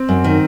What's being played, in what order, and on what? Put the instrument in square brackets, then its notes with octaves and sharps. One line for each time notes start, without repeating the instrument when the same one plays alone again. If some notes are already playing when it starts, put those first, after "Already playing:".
Already playing: [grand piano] C4
[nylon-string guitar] F#2
D#3